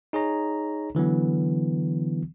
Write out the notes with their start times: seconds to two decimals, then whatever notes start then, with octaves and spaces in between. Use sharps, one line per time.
0.13 D#4 G#4 C#5 A#5
0.95 D3 E3 F#3 B3